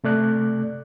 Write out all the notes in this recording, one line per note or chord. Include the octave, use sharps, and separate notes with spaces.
C3 A3 D5 F#6